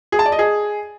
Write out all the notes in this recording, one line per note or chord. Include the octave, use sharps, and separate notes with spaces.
G#4
A5
D5
D#5
G#4